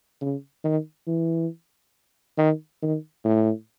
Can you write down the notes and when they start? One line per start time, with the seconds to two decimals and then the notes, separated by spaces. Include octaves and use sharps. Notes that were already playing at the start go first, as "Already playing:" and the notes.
0.21 C#3
0.64 D#3
1.07 E3
2.38 D#3
2.82 D#3
3.25 A2